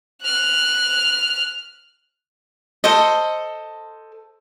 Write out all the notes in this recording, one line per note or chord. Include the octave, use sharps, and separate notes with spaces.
F6 F#6
A4 C5 D#5